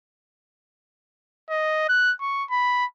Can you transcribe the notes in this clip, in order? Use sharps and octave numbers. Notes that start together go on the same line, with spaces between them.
D#5
F#6
C#6
B5